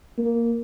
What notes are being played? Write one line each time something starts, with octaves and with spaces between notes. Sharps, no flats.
A#3